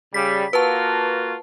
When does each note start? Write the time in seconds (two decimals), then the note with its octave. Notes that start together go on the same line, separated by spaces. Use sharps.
0.14 C#3 G3 B6
0.53 A#3 F4 F#4 B4 A5